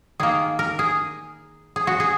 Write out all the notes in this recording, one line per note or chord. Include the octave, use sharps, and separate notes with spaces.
D#3 A#3 G#4
A#4
G#4
G#4
F#4
G#4